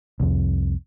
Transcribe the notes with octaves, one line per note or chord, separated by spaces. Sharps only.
C2 F2